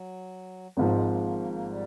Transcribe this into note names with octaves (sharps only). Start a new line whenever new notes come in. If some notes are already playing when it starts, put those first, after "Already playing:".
Already playing: F#3
G#1 G#2 F3 F#3
G#3
A#3
A#3
A#3
A#3
G3